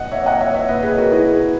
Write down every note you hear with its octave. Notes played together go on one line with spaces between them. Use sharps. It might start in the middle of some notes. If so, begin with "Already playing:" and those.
Already playing: A#2 D#5 F#5
C#5 E5
D#5 F#5
C#5 E5
C#5 E5
A#2 B4 D#5
G#4 B4
F#4 A#4
E4 G#4